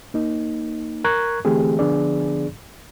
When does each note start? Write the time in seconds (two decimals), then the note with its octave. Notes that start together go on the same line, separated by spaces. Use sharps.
0.14 A#3 D#4
1.04 A#4 A#5 C#6 F#6 G#6
1.45 D3 E3 A3 C4 G4 G#4
1.79 D3 F3 B3 D4 G#4 D5